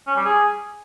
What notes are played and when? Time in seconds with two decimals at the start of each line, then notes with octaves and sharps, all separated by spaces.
0.07 C#4
0.16 G3
0.25 G#4